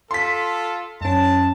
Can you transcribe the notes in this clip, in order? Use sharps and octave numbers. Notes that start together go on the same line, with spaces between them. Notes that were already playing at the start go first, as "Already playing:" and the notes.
F4 A4 C6 B6
F#2 C#4 A5